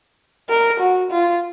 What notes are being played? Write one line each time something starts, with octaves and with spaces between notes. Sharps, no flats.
A#4
F#4
F4